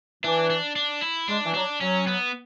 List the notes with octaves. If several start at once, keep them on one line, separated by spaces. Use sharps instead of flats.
E3 D4
D4
D4
E4
G#3 D4
E3
F#3 D4
F#3 C#4
B3